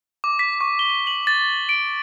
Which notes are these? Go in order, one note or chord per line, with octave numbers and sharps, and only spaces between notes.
D6
B6
C#6
G7
F#7
A6
D7